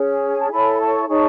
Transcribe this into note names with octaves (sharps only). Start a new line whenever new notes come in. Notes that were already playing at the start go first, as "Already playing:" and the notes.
Already playing: C#4 G#4 C#5
G#5
A5
E4 A4 C#5 G#5 B5
A5 C#6
D#4 G#4 C#5 A5 C#6